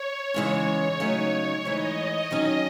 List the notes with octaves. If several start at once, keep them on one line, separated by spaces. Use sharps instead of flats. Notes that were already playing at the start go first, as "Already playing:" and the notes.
Already playing: C#5
E2 C#3 E3 G#3 C#4
C#3 F#3 A3 D#4
G#2 E3 A3 D#5
D#3 F#3 C#4 D#5